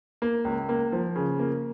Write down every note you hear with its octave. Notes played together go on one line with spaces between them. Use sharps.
A#3
C#2
A#3
F3
C#3
A#3